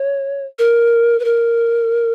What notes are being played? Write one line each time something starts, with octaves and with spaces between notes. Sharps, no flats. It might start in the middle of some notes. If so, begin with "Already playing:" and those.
Already playing: C#5
A#4
B4
A#4